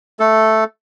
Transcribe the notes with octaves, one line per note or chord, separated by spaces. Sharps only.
A3 A4